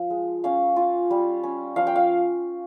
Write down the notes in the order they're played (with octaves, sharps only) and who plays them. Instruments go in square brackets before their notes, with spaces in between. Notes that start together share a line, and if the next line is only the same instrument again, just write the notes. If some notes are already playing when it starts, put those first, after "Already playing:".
Already playing: [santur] F3
G#3
C#4 F5
F4
G3
C#4
F3 F5
G5
F5